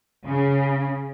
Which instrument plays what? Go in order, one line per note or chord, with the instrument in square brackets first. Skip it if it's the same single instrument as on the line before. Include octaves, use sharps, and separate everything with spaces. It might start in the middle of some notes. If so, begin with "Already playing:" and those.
[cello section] C#3